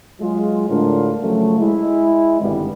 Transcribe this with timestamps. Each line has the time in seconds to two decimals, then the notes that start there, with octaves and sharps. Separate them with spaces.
0.20 F#3 G#3 F4
0.69 A2 D3 G#3 D4 F4 A#4
1.22 C#3 F3 F#3 A3
1.59 G#3 E4
2.41 G#1 G2 B2 D3 G3 B3